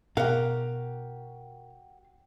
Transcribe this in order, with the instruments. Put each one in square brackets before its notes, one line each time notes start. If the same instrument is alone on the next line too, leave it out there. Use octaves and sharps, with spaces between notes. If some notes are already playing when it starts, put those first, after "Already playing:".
[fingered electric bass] B2 [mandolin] F#4 G4 [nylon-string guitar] A#4 [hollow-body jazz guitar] F5